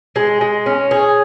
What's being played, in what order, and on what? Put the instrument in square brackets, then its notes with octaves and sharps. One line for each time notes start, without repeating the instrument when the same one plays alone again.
[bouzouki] G#3
G#3
C#4
G#4